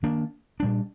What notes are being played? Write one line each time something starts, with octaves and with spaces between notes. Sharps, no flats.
D#3 A#3 D4
A#2 G3 D4